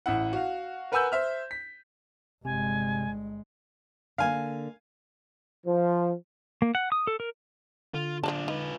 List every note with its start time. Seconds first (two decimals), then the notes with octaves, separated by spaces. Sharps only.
0.06 A1 E4 F#5
0.33 F#4 F5
0.92 A#4 B4 F#5 G#5 E6 G6
1.12 C5 E5 F6
1.51 B6
2.45 G1 C3 G#3 G#5
4.18 D3 A#3 F5 G#5
5.66 F3
6.62 A#3
6.75 F#5
6.92 D#6
7.07 A4
7.20 A#4
7.94 D3 F4
8.23 F3 D4 F4 D5 A5
8.48 D#4 F4 B4